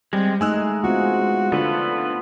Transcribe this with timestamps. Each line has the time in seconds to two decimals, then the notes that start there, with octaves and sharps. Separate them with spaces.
0.13 G3 G#3 C4
0.41 G#3 A3 D#4 D#5 G#5 E6 F#6
0.84 B3 C4 F4 F#4
1.52 D3 B3 F4 A4 B4